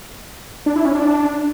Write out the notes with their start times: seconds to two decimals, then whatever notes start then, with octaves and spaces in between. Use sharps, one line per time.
0.66 D4
0.76 E4
0.85 C#4
0.95 D4